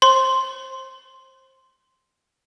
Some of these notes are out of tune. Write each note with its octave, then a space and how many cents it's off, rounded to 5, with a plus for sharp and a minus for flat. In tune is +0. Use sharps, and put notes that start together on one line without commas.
C5 +20 C6 +0